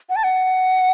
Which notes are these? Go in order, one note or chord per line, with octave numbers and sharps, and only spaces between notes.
F#5
A5
F#5